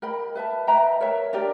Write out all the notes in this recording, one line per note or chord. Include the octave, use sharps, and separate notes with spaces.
A#4 D#5 G5 B5
B4 E5 A5
B4 E5 G5 A#5
A#4 C#5 E5
D4 G4 A#4 D5